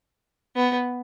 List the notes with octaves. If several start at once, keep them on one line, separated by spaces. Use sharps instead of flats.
B3